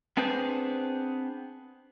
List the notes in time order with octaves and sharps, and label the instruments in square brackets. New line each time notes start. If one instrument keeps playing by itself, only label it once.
[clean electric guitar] B3 C4 D4 G#4 B4 C5